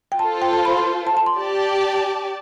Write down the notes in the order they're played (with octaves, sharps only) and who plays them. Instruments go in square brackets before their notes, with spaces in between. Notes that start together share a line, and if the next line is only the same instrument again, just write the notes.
[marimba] G5
[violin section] F4 A4 C5 [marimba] A5
[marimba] G5
A5
B5
C6
A5
A5
C6
[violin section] G4 D5 A5